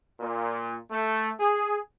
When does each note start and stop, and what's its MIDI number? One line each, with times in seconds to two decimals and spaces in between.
0.20 0.75 46
0.91 1.29 57
1.40 1.78 68